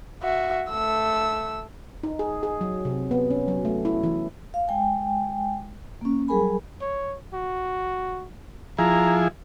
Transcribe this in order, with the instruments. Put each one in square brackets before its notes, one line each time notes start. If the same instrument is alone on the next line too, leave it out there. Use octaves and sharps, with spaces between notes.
[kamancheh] F#4 E5
A3 E6
[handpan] D#4
G#4
G#4
F#3
C3
B3
C#4
F#3
A3
E4
E3
[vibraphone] F5
G#3 G5 G#5
A#3 C#4
F#3 G3 G#4 A#4 G#5 B5
[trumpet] C#5
F#4
[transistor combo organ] F3 E4 G#4 [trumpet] A#5